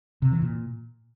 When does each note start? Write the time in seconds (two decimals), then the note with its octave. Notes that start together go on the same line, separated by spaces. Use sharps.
0.22 C3
0.32 E3
0.42 A#2